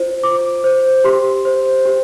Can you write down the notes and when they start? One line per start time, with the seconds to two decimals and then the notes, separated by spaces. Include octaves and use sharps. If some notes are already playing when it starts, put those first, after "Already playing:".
Already playing: F4 C5
0.23 F4 D6
0.64 C5
1.04 G4 C6
1.45 C5
1.85 G4